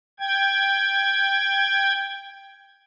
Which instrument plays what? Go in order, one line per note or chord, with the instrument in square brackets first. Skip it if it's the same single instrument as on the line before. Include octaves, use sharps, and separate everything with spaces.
[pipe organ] G5 G#6